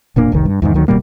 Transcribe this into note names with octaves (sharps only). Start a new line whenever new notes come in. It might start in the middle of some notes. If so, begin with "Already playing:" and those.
E1 A#2 A#3 D4
F1 C2 D#3
G2
E2 G#2 D#3
D2 D#3 F#3
D1 B2 G3 A#3